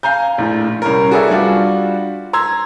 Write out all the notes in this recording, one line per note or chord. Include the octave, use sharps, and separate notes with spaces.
F5 G#5 A#5 G6
A#1 A2
C2 C#4 A#4
F#4 G#4 A4 B4 D5 E5
G3 D4 F4 F#4
A#5 C6 E6 G#6